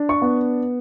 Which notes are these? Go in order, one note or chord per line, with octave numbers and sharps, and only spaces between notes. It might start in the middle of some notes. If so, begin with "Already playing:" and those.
Already playing: D4
C#6
B3